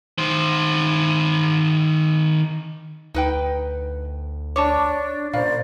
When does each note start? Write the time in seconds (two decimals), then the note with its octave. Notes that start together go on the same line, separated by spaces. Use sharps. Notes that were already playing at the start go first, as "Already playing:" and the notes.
0.18 D#3 C5
3.14 D2 D#4 B4 G5
4.56 D4 C#5 A5 C#6 D6
5.34 A#2 C#3 A#4 C5 D5 F5